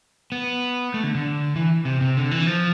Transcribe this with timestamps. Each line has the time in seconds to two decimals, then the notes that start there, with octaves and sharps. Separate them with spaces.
0.32 B3
0.94 A3
1.04 D3
1.15 D3
1.56 E3
1.85 C3
2.01 C3
2.17 D3
2.31 E3
2.47 F3